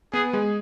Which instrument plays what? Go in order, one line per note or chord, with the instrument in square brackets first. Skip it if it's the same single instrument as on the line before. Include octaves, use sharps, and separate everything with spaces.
[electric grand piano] B3 B4 [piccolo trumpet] G#4
[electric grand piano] G#3 G#4